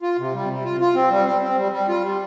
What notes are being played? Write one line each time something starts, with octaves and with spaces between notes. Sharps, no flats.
F4
C3
G3
C3
F4
F4
C4
G3
C4
C4
G3
G3
F4
G3